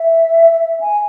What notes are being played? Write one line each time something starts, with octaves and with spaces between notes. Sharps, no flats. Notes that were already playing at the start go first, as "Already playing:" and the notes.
Already playing: E5
E5
G#5